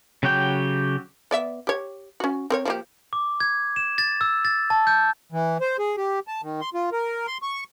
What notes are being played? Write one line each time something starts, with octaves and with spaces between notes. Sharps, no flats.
C#3 F#3 F#4 G4 G5
B3 D5 E5
G4 C#5
C#4 F#4
C4 A#4 C#5
F3 A#3 G4
D6
G#6
E7
A6
E6
A6
A5
G6
E3
C5
G#4
G4
A5
D#3
C6
F4
A#4
C6
C#6